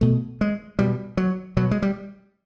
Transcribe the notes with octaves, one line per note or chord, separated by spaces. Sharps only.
B2 A3
G#3
B2 G3
F#3
B2 F#3
G#3
G3